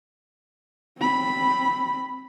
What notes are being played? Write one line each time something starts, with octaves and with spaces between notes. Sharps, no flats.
C4 B5